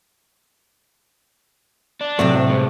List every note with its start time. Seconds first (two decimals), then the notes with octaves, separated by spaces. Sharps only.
2.01 D4
2.19 A2 C3 F#3 A3
2.35 C5 E5
2.50 G2 G#3